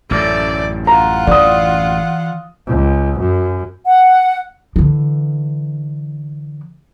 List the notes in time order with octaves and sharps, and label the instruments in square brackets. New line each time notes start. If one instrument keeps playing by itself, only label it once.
[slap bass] A1 F#2 [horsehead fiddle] A3 D5
[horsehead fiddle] F4 F#5 [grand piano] A#5
[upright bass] E3 [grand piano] D5 D#6
[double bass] C#2
F#2
[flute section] F#5
[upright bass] D3 E3